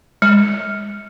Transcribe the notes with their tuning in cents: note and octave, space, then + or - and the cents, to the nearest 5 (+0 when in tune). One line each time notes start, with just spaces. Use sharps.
G#3 -25